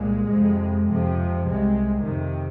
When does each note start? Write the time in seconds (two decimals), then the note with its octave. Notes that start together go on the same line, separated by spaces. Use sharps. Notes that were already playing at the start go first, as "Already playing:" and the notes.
Already playing: C2 A#2 G#3
0.30 F2 C3
0.87 F2 C3 F3
1.46 C2 C3 G#3
2.03 F2 C3 D#3